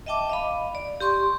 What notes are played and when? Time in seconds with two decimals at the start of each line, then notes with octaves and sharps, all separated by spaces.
0.06 D#5 E5 G5 A5 D6
0.30 D#5 F5 B5
0.75 D5
1.00 G4 C6 C#6